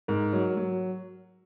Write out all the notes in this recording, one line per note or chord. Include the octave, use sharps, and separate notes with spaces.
G#2 A#4
F#3
F#3